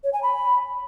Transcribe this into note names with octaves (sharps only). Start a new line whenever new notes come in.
C#5
G#5
B5